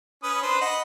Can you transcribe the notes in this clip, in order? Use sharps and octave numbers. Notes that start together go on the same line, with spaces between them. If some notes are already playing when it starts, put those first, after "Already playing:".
C#4 B4 D#6
D4 B4 C5
D#5 F#5 B5